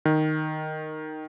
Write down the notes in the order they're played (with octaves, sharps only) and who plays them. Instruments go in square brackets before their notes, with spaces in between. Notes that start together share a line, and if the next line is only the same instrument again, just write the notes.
[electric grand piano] D#3